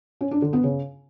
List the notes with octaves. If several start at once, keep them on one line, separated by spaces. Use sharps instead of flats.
C#4
D4
D3
B3
C#3